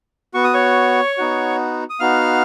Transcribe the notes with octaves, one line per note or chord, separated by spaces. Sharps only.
B3 F#4 C#6
D#6
C#5 C#6
B3 D#4 F#4
D#6
B3 D#4 F#4 F5 F6